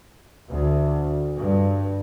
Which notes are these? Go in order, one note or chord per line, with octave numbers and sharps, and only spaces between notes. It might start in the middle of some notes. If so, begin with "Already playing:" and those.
D2
G2